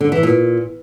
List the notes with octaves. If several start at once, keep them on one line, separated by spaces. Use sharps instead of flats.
D3
E3
A#2